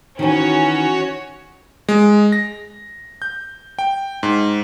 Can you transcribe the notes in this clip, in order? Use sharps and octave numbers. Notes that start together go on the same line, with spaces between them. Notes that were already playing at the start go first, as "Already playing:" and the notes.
D#3 E3 C#4 F#4 C#5
G#3
A#6
G6
G5
G#2